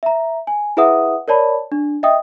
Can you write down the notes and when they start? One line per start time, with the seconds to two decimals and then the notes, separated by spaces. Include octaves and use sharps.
0.03 E5 A#5
0.47 G#5
0.77 E4 G#4 B4 E5 F#5 D#6
1.28 A#4 C#5 D5 A5 B5
1.72 D4
2.03 D#5 E5 G5 D#6